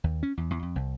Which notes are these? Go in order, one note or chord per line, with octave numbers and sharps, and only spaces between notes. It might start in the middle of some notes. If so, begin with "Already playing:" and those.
D#2
C#4
E2
E2
F2
C2